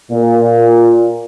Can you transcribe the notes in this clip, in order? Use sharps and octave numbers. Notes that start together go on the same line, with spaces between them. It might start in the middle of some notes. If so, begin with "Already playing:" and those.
A#2